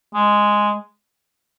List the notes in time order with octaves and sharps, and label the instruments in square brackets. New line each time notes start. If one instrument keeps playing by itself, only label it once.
[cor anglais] G#3